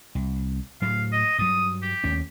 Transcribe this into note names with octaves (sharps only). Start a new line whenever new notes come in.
C2
A2 F#3 A3 F5
D#5
G2 F#3 D#6
G4
D#2 A3 C#4